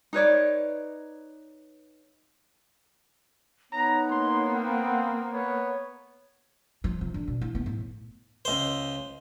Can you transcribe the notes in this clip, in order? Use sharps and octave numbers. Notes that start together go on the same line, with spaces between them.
D#4 B4 C#5 D5
B3 D#4 C#5 A#5
A#3 C6
C4 F5 F#5
B3 C#5
F3
C3
D3
B2
E4
B3
A2
C#2 C5